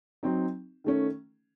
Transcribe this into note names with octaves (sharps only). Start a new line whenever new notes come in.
F#3 C4 D#4
D#3 A3 C#4